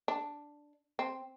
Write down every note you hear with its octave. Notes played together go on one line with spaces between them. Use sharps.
D4
C4